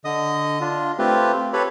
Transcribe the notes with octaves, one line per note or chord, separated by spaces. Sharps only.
D3 D#5 D#6
D4 F4
A3 C4 F4 G4 B4
G4 A4 B4 C#5 B5